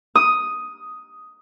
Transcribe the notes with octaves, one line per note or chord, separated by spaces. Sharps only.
D#6